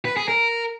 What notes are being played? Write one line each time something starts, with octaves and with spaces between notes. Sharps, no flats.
B4
G#4
A#4